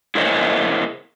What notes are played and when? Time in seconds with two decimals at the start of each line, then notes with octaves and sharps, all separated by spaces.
0.15 E4 G#4 A#4 C5 C#5 D#5